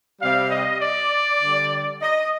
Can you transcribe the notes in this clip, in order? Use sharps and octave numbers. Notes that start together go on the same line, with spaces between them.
C3 G3 F5
D#5
D5
D3 G3
D#5